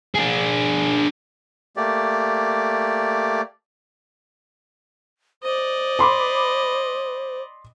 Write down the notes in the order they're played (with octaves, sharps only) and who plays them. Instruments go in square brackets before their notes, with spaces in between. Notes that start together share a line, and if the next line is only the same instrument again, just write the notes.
[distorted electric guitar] D4 G#4
[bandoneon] A3 A#3 G4 D5
[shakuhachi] C5 [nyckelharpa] D5 D#5
[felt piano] B5 C6 D6